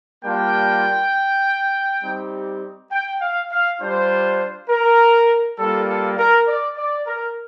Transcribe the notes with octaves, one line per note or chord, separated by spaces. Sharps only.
G3 A#3 D4 F4 G5
G3 C4 D#4 G4
G5
F5
F5
G3 D4 F4 C5
A#4
G3 A#3 F4 A4
A4
A#4
D5
D5
A#4